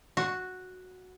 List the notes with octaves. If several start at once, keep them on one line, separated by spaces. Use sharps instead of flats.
F#4